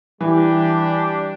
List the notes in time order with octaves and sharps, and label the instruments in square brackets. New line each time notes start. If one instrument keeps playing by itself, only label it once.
[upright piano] E3 [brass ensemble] G3 D4 G4